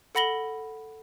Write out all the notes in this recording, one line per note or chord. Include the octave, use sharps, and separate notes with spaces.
A4 F#5 B5 A#6 F#7 G7